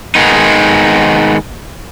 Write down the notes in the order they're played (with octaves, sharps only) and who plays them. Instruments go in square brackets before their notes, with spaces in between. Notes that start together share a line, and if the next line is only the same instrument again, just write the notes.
[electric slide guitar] D#3 G#3 B3 D#4